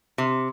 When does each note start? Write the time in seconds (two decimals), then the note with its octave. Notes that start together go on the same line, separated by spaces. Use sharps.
0.18 C3